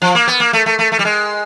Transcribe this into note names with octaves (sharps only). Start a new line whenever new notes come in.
F3
A#3
B3
A#3
A3
A3
A3
A3
G3
G#3